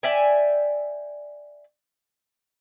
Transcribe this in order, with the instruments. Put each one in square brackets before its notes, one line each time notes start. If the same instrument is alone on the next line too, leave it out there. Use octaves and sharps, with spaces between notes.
[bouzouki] D5 E5 G5 G#5